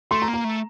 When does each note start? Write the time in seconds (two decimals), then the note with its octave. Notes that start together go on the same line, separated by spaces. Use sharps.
0.11 A3 C6
0.22 A#5
0.28 A#3
0.34 A#5
0.44 A3